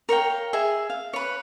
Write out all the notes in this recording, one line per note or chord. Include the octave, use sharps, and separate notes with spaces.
A#4 C#5 F5 G5
G#4 E5
F5
B4 C#5